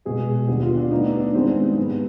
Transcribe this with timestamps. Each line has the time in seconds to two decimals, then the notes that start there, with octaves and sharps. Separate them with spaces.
0.05 B2 G#3 B3 G#4
0.48 D#2 D3 G3 B3 G4
0.63 F4
0.77 D4
0.91 D2 D3 G3 B3 D#4
1.06 D4
1.20 D4
1.34 G2 D#3 G#3 B3 C4
1.77 G#2 G3 B3